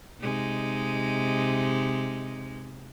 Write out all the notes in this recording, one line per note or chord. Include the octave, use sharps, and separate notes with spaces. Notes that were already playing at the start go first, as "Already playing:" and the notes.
C3 G#3 D#4